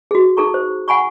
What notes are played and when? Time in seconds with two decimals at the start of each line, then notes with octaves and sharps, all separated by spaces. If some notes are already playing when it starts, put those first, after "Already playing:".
0.11 F#4 G#4
0.37 D#4 G#4 A4 A#5 C#6
0.54 C5
0.88 F#5 G#5 B5 C#6